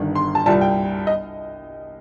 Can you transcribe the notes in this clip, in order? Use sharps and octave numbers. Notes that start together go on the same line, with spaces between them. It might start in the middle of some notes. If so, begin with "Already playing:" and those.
Already playing: G1 G2 D#3
C6
A5
C2 A#2 G3 A5
G5
D#5